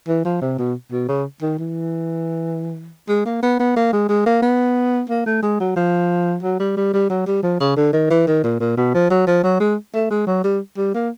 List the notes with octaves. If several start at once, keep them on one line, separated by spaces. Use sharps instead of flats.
E3
F3
C3
B2
B2
C#3
D#3
E3
G#3
A#3
B3
B3
A#3
G#3
G#3
A#3
B3
A#3
A3
G#3
F#3
F3
F#3
G3
G3
G3
F#3
G3
F3
C#3
D3
D#3
E3
D#3
A#2
A#2
B2
F3
F#3
F3
F#3
G#3
A3
G#3
F#3
G3
G3
A#3